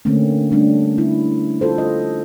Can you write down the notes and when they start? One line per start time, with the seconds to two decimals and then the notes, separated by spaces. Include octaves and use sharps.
0.05 D3 A3 A#3 C4 C#4
0.52 G3 A3 C#4 D4
0.98 E4
1.61 F4 A4 C5
1.78 D#5